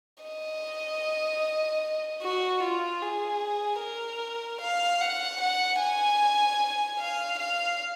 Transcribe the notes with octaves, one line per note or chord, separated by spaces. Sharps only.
D#5
F#4
F4
G#4
A#4
F5
F#5
F#5
G#5
F5
F5